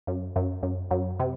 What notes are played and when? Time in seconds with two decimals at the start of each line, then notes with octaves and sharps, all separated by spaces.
0.07 F#2
0.36 F#2
0.63 F#2
0.91 F#2
1.19 C3